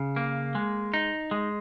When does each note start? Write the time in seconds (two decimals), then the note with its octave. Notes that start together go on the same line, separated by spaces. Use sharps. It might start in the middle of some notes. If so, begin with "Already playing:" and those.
Already playing: C#3
0.16 A#3
0.55 G#3
0.94 D#4
1.31 G#3